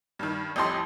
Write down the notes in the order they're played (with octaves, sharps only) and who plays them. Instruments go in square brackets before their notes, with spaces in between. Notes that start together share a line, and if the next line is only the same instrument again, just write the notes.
[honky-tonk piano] G2 D#3
A1 F2 G4 D#5 A5 C6